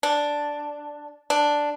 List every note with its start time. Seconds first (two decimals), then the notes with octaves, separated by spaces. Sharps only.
0.03 D4
1.30 D4